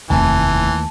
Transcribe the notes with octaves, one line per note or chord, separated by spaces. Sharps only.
F1 D#2 D#3 E3 A3 G#5 A5